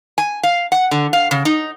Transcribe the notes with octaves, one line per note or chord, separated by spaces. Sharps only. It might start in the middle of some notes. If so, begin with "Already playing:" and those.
G#5
F5
F#5
D3
F5
C#3
D#4